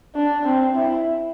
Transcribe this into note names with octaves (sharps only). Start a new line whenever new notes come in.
D4
C4
E4